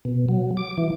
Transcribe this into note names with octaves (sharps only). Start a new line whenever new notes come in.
B2
F#3
D6
E3